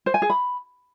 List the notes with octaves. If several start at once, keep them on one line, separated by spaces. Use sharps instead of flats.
C5
G#5
G#4
B5